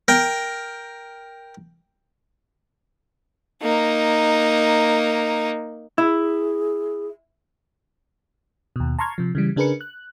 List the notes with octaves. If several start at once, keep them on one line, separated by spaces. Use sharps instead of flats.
A#4 G5
A#3 D#4
E4 G#4
D#2 B2
A5 A#5 C6 C#6 F6 G#6
C3 F3
C#3 E3 G3
C#3 D4 G#4 A#4 B4 C#7
F#6